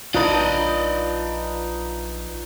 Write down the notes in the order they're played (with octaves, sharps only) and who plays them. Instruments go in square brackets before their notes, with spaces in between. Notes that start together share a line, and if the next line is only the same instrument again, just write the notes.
[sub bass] A#1 [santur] D4 D#4 [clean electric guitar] F4 B4 [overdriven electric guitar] D5 D#5